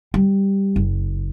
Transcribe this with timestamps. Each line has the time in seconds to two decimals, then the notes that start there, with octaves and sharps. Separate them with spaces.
0.14 G3
0.76 F#1